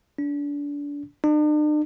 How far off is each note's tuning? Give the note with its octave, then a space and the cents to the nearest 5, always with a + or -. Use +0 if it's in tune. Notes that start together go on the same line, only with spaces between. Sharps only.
D4 -30
D4 +45